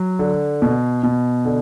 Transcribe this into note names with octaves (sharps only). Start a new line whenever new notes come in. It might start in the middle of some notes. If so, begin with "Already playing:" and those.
Already playing: F#3
D3
B2
B2
D3